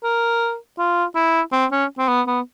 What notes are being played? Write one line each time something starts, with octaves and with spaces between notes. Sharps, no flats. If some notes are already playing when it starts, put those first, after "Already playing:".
A#4
F4
E4
C4
C#4
C4
B3
B3